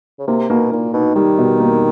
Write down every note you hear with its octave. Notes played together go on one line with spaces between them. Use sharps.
C#3
C3 A#3
B2 A#3
A#2 A#3
B2 D#4
D#3 G3
B2
A#3